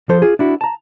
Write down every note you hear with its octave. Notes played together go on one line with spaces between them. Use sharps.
F3 A4 C5
F4 G#4
D4 E4 F#4
A5 A#5